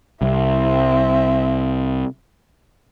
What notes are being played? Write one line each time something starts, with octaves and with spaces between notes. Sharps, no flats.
C2 C4 E5